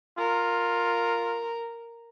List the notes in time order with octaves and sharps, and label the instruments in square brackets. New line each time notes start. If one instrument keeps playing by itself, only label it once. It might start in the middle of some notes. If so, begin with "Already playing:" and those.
[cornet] F4 [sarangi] A#4